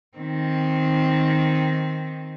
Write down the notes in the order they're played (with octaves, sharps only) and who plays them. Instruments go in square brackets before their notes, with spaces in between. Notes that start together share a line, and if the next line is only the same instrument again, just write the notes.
[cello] D#3 C4